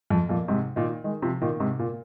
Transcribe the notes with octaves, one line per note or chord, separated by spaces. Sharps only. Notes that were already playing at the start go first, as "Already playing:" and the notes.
F2
F2 A#2
G#2 C3
A#2 D#3
D#3 G#3
C3 F3
A#2 D#3
G#2 C3
A#2